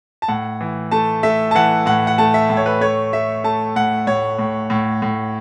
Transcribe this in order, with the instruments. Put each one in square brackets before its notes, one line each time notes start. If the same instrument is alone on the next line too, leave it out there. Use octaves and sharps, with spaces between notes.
[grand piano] A5
A2 F#5
E3
A3 A5
A3 E5
A5
E3 F#5
A2 F#5
F#5
A3 A5
E5
A2
C#5
B4
A3 C#5
A3 E5
A3 A5
A2 F#5
A2 C#5
A2
A2
A2